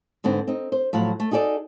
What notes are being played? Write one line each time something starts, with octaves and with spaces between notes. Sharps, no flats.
G#2 D3 B3 C4
C4 D#4
C5
A2 F3 F#3 F#5
A3
D#4 F#4 G#4 A4 D5